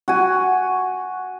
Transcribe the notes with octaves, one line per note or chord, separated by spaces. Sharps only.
F#4 G#5